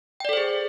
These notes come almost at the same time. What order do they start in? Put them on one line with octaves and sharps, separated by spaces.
G5 D5 A4 C5 G#4